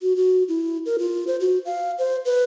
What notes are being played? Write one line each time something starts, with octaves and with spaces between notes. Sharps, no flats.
F#4
F#4
E4
A#4
F4
C5
F#4
F5
C5
B4